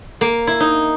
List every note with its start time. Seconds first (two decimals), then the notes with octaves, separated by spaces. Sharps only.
0.21 A#3
0.47 E4
0.60 D#4